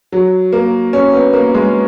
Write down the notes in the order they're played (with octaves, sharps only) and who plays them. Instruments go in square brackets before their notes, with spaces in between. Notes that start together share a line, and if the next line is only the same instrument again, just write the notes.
[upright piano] F#3
A#3
C#4
B3
A#3
G#3